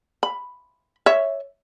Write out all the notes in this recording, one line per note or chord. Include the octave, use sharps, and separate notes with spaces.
B5
C#5 E5